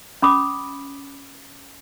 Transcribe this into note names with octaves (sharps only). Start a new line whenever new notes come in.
C#4 B5 D6 D#6